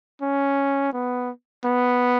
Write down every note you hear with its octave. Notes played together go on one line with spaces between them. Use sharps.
C#4
B3
B3